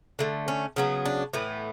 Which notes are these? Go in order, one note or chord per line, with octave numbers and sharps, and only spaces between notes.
D3 A3
C#4
C#3 F#3 B3
D4
A2 E3 B3